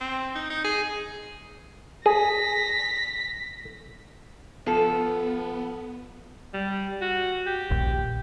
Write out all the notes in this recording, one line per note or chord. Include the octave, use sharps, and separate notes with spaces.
C4
D#4
D#4
G#4
G#4 A#6 B6
F3 B3 A4
G3
F#4
G4
D#1 A#1